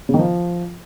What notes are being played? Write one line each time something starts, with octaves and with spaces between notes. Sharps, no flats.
C#3
D#3
F3